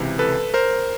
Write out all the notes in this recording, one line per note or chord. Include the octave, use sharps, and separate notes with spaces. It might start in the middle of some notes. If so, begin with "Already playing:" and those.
Already playing: C#2 C3 E3
A4 B4
A#4 C5